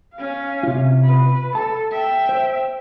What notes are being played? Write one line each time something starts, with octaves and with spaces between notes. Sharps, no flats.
C#4 F5
C3 F4
B4
A4 A5
E5 G5
C5